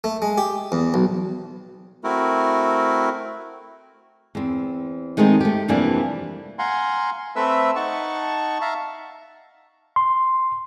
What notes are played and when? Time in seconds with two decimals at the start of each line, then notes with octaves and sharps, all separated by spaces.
0.04 A3
0.22 G#3
0.38 G4
0.72 E2
0.94 B1
2.04 A3 C4 E4 F#4 A#4
4.35 E2 C4
5.17 D#3 G#3 A3 B3 C4 D#4
5.41 A3 G4
5.68 F2 C3 E3 G3 A#3 D4
6.59 F5 F#5 G#5 A#5 C6
7.36 A3 C4 A4 B4 E5 E6
7.76 D#4 F#5 A5 C#6
8.61 E5 F5 A5 A#5
9.96 C6